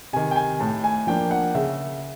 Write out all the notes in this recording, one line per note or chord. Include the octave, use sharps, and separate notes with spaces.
C3 D#3 G#5
G5
G#5
A2 A5
G#5
F3 A#3 D4 G5
F#5
C#3 E5